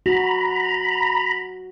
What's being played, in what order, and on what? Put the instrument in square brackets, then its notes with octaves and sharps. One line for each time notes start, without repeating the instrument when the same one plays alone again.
[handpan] F#4 [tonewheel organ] A#5 B5